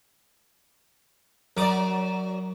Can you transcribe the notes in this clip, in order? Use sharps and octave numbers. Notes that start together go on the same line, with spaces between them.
F#2 F#3 D5 D6 D#6